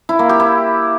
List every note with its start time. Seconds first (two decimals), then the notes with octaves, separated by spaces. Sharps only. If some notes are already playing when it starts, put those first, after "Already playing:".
0.09 E4
0.19 A#3
0.29 G4
0.40 E4